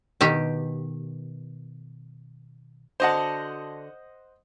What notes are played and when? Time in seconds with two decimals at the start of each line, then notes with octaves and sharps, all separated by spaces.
0.21 B2 D#3 G4
3.00 D3 F#4 C5 D#5 F#5 A5